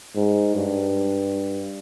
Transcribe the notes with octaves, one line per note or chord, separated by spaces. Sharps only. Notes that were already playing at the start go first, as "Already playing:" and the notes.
G#2
G2